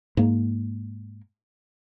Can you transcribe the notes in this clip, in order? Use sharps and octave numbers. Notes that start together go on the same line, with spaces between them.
G#2 A#3